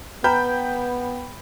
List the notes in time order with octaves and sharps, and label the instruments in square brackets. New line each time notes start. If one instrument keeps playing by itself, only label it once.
[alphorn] B3 [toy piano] B4 A#5 [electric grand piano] G5 B5 G6